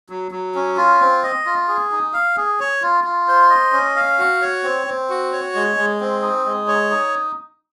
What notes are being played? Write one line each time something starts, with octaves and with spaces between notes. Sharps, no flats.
F#3
F#3
C#4
F4
C4
D#5
F4
G#4
D#4
F5
G#4
C#5
F4
F4
C5
D#5
C#4
F5
F#4
C#5
C4
C4
F#4
C#5
G#3
G#3
C4
D#4
G#3
C#5
D#4